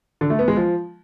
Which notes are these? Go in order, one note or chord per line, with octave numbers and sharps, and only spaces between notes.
D3
A3
B3
G#3
F3